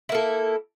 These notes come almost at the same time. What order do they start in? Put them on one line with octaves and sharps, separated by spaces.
E4 A#3 A4